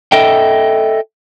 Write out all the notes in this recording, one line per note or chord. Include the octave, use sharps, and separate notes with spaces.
A4 D#5 E5 G5